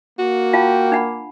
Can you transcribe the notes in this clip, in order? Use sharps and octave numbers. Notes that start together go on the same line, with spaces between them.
A#3 F#4
F4 F5 G5 A5
D4 F#5 B5